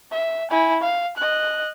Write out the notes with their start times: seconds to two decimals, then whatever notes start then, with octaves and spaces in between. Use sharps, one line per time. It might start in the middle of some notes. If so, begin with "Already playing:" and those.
0.11 E5
0.51 E4 G#5
0.81 F5
1.17 D#5 F#6